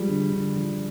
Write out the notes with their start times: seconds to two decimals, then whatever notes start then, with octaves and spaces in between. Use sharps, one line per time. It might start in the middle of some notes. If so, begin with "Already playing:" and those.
Already playing: F3 G3 G#3
0.08 D3
0.32 D3
0.56 F3